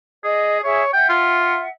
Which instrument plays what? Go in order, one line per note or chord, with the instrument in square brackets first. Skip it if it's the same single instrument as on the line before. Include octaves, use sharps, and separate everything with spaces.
[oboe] G#4 [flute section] D5 D#5
[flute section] G#4 E5 [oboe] C#5
[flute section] E5 F#5 [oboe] G5
[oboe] F4